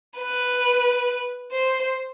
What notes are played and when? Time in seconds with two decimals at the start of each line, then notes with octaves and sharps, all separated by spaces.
0.18 B4
1.52 C5